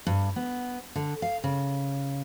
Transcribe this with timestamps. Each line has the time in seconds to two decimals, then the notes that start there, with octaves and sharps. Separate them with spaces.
0.07 G2
0.36 B3
0.95 D3
1.22 F5
1.44 C#3